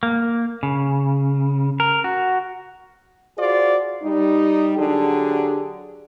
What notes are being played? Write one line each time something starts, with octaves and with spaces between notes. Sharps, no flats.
A#3
C#3
A#4
F#4
F4 F#4 G#4 C5 D5
G3 D#4
D3 F#3 D4 G4 G#4